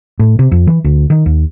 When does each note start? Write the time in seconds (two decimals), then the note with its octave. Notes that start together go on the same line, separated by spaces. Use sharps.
0.19 A2
0.39 C3
0.52 F2
0.67 E3
0.84 D2
1.10 D#3
1.26 D#2